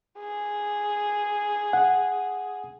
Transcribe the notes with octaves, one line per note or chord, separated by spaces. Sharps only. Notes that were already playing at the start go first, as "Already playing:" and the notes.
G#4
F#5